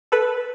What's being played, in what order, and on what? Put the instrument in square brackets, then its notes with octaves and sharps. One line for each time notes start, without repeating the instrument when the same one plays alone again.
[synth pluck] A4 B4